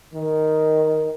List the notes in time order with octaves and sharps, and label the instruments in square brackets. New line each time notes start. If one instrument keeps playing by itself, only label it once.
[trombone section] D#3